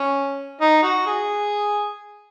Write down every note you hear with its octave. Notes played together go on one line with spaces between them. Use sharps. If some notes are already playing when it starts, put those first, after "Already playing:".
Already playing: C#4
D#4
F#4
G#4